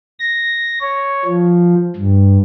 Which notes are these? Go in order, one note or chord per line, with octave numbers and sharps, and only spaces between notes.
A#6
C#5
F3
G2